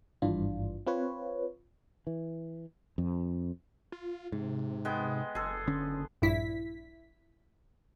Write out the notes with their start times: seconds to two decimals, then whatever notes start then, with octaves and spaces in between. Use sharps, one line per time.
0.22 G#1 G2 E3 D4 F4
0.87 C4 F4 B4 C#5
2.07 E3
2.98 F2
3.92 F4
4.32 G#2 C3
4.85 G#3 B3 G5
5.35 F#1 G#4 A4
5.67 D3 C#4
6.22 A#1 G2 E4 B6